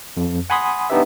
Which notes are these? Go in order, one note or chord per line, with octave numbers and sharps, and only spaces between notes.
F2
F#5 G#5 B5 C6 D#6
B3 D4 D#4 G4 B4 E5